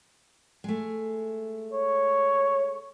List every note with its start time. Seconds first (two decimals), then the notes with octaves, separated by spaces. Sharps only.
0.64 G#3 A3
1.73 C#5